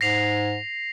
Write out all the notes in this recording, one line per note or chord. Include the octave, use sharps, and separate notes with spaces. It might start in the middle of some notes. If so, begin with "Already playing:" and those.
G#2 A#6 C7 F7